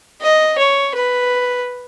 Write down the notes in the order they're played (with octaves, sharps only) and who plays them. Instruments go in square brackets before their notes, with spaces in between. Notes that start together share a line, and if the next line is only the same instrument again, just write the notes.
[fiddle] D#5
C#5
B4